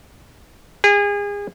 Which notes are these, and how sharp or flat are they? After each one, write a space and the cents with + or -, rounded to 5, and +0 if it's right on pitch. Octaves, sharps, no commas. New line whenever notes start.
G#4 -30